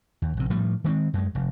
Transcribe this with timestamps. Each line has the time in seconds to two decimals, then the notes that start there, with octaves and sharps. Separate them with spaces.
0.22 D#2
0.37 A#1 C3
0.50 A2 F3 G3
0.84 D#3 G#3 B3 C4
1.14 F#2 G#3
1.35 F1